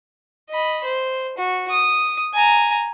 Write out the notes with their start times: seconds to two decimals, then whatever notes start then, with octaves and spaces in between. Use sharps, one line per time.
0.50 D#5 B5
0.85 C5
1.38 F#4
1.70 D#6
2.34 G#5 A#5